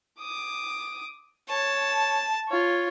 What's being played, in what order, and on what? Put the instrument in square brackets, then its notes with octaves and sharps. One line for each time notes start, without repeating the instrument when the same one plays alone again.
[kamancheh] D6 D#6
[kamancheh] C#5 [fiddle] A5
[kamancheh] F4 C#5